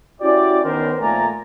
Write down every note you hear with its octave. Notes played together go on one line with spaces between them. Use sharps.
C#4 E4 F#4 G4 D5
D#3 B3 C#4 A#4 C5
F2 A#2 A3 D5 G#5 A#5